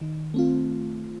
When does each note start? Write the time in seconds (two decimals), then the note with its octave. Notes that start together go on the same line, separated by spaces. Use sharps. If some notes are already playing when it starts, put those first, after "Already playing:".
0.01 D#3
0.34 A3 C4 F4